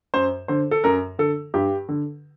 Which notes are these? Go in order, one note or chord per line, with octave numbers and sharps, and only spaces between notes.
F#2 C5
D3 C5
A4
F#2 A#4
D3 A4
G2 G4
D3